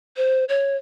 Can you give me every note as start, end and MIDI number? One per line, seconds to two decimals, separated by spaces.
0.17 0.45 72
0.49 0.76 73